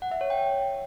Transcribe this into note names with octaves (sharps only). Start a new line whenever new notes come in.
F#5
E5
C#5
G5